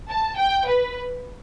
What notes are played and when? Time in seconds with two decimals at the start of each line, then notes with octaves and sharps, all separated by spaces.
0.09 A5
0.38 G5
0.68 B4